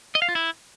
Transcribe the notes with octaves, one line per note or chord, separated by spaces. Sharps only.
D#5
F5
F4
E4